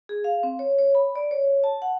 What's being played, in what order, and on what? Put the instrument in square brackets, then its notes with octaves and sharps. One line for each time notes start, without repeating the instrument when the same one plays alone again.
[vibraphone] G#4
F5
C4
C#5
C#5
B5
D5
C#5
A5
F#5